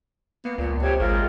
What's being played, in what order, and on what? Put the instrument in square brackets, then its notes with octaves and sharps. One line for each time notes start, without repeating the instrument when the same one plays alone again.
[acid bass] A#3 [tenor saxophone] B3
[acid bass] C#2 [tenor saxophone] A#2
[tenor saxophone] C3 [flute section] G4 C#5
[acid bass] G#1 [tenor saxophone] G#3 [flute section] F4 A#4